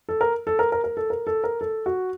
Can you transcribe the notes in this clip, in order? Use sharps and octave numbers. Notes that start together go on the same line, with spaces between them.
A4
A#4
A4
A#4
A#4
A#4
A4
A#4
A4
A#4
A4
F#4